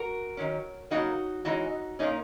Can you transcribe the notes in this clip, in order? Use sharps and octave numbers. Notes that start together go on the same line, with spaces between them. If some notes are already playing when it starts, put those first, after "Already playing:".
Already playing: F#4 A#4
D#3 F#3 C#4
C#3 F#3 A#3 D#4 F#4
E3 G#3 C#4 D#4 F#4
A#2 A#3 C#4 D#4